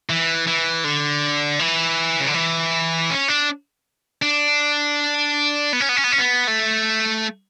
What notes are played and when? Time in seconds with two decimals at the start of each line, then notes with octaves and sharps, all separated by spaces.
0.09 E3
0.47 E3
0.84 D3
1.59 E3
2.20 C#3
2.27 D3
2.34 E3
3.10 C#4
3.28 D4
4.22 D4
5.73 B3
5.80 C#4
5.89 B3
5.97 C#4
6.04 B3
6.12 C#4
6.19 B3
6.47 A3